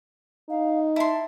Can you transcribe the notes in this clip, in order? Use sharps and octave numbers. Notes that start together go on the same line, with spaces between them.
D#4 F5
E4 A5 C6